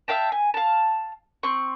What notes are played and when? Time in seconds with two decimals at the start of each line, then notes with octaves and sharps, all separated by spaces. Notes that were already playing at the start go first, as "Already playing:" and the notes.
0.08 E5 F5 G5 A5
0.32 G#5
0.54 F5 A5
1.43 C4 C#6